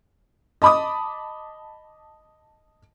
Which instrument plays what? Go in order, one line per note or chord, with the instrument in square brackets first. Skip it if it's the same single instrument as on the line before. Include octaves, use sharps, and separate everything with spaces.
[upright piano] D#5 A5 B5 D6 D#6